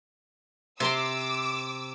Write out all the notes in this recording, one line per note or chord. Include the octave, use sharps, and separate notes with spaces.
C3 C4 C6 D6 E6